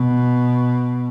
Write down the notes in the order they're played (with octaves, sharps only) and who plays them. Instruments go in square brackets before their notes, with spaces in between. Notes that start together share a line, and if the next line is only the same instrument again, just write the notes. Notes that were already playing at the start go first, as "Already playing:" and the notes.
Already playing: [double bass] B2